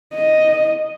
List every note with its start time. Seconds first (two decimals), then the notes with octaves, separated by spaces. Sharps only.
0.14 D#5